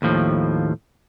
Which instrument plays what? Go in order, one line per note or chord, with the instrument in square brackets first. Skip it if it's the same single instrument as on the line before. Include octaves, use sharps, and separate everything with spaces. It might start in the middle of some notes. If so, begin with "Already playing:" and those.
[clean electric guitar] D#2 A2 F3